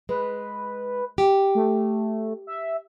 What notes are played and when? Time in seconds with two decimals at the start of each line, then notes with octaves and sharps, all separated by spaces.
0.09 G#3 B4
1.18 G4
1.55 A3
2.47 E5